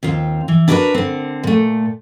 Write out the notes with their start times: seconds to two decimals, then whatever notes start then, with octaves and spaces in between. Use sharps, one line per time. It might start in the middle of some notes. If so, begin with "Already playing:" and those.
0.03 D#2 C4 F4
0.48 E3
0.68 D4 E4 F#4 G#4 A#4 B4
0.94 D3 C4
1.43 A#2 A3